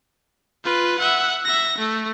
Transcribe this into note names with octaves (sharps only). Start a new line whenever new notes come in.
F4 B4
E5 F#5
E5 A#6
A3